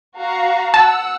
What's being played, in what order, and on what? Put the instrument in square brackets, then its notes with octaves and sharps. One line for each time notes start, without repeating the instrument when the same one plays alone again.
[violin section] F#4 F5 A#5
[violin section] F#5 E6 [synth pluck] A5